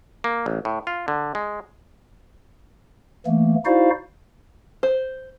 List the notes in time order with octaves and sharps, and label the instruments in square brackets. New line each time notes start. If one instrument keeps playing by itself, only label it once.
[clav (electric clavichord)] A#3
A1
A2
F4
D3
G#3
[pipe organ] E3 A3 A#3
D#4 E4 F#4 C5 D5 F5
[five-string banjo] C5